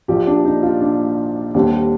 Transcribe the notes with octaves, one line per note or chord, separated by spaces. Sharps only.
A#1 A#2 F3 G4
D4
D#4
F4
D4
D#2 D3 G3 C4